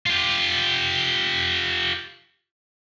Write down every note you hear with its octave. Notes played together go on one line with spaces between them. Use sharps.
F4 G4